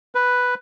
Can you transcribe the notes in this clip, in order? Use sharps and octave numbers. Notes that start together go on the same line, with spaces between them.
B4